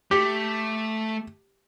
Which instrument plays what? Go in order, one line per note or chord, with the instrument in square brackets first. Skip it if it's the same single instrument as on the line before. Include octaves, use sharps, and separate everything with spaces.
[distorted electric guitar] A3 [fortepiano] G4